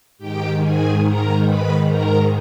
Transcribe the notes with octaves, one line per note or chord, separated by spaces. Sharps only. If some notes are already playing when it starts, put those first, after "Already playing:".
G#2 D#3 G4 G5
G#4 G#5
A#4 A#5
B4 B5
A#4 A#5